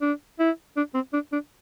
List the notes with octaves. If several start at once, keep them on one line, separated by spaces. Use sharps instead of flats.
D4
E4
D4
C4
D4
D4